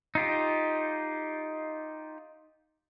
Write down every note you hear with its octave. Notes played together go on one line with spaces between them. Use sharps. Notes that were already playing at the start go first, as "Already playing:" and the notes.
D#4 F4 G4